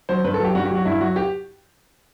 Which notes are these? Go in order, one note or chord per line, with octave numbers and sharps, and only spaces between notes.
F#3 C5
G2 B4
A4
F#3 G4
G2 F#4
G4
F#3 F#4
G2 E4
F#3 F#4
G4